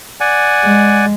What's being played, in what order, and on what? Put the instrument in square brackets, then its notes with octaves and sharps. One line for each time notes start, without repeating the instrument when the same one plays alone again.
[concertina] D5 F#5 G#5
[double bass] G#3